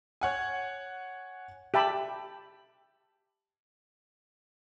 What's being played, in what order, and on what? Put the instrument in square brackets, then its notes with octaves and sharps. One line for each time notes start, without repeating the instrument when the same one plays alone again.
[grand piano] C#5 F#5 G#5
[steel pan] G4 E5 A5 B5